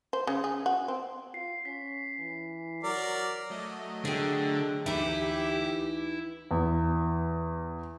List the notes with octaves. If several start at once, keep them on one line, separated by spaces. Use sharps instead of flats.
C5
C#3
G#4
F#4
C4
F4 C7
C#4 B6
E3
F#3 A#4 D5
F#3 A3 D#5
D3 G#4 G5
D2 E3 D#4 E4 G4 D6
E2